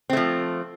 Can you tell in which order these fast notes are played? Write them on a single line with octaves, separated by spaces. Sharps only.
C4 A3 F3